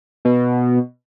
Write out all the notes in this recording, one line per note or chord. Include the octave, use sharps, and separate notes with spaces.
B2